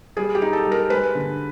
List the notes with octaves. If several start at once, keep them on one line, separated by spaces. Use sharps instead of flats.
G3 G#4
G4
D#4
A4
G3
A#4
G#3 B4
D3